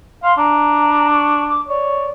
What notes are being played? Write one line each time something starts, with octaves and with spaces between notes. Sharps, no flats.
F5 C6
D4 A#5
C#6
D6
C#5 D5